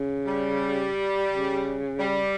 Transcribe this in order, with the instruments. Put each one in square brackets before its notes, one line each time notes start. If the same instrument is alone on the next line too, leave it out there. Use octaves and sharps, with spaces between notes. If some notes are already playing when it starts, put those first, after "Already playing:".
Already playing: [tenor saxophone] C#3
[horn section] G3
[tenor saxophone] C#3
[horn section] G3